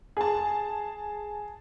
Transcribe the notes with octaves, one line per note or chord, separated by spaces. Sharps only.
G#4 A5